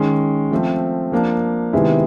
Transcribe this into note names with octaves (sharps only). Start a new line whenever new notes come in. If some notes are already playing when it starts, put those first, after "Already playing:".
Already playing: D#3 G#3 C#4
F3 A3 C4
F3 A#3 D4
C3 D#3 G#3 B3 E4